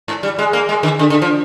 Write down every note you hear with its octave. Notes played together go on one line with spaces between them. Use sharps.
G#2
G3
G#3
A#3
G#3
D#3
D3
D3
F3